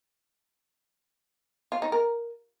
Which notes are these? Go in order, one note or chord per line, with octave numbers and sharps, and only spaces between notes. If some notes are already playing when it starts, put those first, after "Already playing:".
F4
D#4
A#4